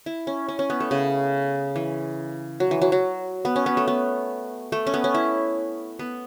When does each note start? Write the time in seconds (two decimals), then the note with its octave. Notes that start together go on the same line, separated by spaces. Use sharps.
0.06 E4
0.27 C#4
0.49 C#4
0.59 C#4
0.70 B3
0.80 A3
0.91 C#3
1.76 E3
2.60 F#3
2.71 E3
2.82 F#3
2.92 F#3
3.45 B3
3.56 C#4
3.66 B3
3.77 A3
3.88 B3
4.72 A3
4.87 C#4
4.94 B3
5.04 C#4
5.14 E4
5.99 B3